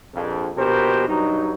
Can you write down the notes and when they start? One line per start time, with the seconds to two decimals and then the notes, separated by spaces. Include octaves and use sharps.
0.14 A#1 F2
0.56 A#1 B2 G4 A#4 C5
1.08 G2 F#3 D#4